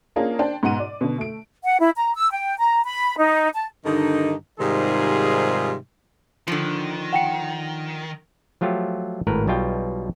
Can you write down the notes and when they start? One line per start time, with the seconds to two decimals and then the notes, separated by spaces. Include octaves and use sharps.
0.16 A#3 C#4 D4 F4 G#4 A#4
0.39 D4 C5 G5
0.63 G#2 B2 F#5 D#7
0.79 D5
1.01 B2 D3
1.18 A3 D7
1.63 F#5
1.79 E4
1.97 A#5
2.16 E6
2.31 G5
2.58 A#5
2.84 B5
3.18 D#4
3.54 A5
3.85 G2 D3 D#3 D#4
4.60 G#2 C3 D#3 G3 F4 G#4
6.48 D3 D#3 F3
7.13 F#5 G5 C#7
8.61 F3 F#3 A3 F4 G4
9.27 G#1 A2 A#4 B4
9.47 B1 B2 G3 F4 G5